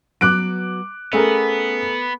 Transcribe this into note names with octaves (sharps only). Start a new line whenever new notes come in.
F#3 B3 B4 D6 F#6 D7
A3 B3 C#4 G#4 A#4